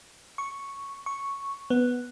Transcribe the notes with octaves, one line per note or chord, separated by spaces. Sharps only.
C#6
C#6
B3